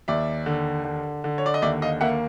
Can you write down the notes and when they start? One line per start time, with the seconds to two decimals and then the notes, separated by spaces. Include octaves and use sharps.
0.08 D#2 D5 E5
0.46 D3
0.84 D3
1.24 D3
1.38 C#5
1.46 D5
1.54 D#5
1.62 D#2 D5 E5
1.82 D#5 F5
2.01 A#3 E5 F#5